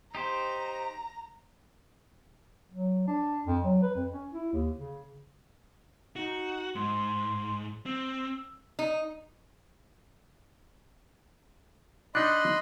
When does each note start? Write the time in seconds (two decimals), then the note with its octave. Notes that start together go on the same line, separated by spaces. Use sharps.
0.15 D#4 G4 C5 A#5
2.71 F#3
3.07 D4
3.47 F2
3.64 F#3
3.82 B4
3.95 F2
4.12 C#4
4.32 E4
4.53 D#2
4.79 C#3
6.16 D#4 F#4
6.75 G#2 C6
7.86 C4 E6
8.79 D#4
12.15 D4 D#4 D#5 B5 C6 F#6